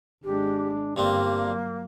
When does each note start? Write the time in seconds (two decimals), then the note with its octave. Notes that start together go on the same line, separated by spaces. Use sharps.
0.24 G#1 G#3 D4 G4
0.96 G1 G2 A#3 C4 D4 G4
1.43 F#3